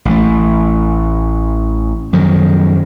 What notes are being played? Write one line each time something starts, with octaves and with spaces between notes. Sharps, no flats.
A1 A3
F#2 D#3 F3 F#3